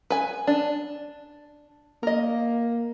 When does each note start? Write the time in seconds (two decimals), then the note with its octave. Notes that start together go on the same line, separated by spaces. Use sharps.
0.10 B4 G#5
0.47 D4
2.03 A#3 A#4 D#5